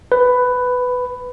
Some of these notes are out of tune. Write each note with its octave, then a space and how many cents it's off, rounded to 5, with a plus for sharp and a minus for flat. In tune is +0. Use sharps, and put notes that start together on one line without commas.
B4 +10